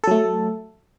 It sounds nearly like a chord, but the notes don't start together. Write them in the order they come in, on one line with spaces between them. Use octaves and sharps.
A4 F#3 A3